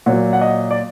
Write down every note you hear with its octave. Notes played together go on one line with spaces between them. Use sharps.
A#2 F#3 F#5
F#5
D#5
D5